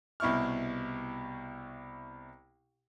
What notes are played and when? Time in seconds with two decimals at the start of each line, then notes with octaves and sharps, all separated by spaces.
0.20 C2 B2 E4 C#6 F6